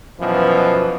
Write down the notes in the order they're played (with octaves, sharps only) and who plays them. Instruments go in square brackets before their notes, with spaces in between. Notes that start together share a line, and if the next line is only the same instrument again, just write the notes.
[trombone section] F#2 B2 E3 F3